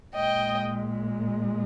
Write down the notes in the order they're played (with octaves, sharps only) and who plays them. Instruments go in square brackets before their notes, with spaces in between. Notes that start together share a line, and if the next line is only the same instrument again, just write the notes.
[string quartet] A#2 G#3 D#5 G5